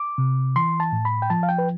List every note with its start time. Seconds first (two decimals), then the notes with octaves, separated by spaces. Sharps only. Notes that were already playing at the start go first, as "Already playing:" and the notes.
Already playing: D6
0.18 C3
0.56 E3 C6
0.80 A5
0.92 A2
1.05 B5
1.22 G5
1.30 F3 A5
1.43 F5
1.49 G5
1.58 B4